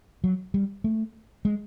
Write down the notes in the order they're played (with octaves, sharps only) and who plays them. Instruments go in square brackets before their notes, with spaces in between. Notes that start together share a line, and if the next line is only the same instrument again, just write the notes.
[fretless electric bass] F#3
G3
A3
G#3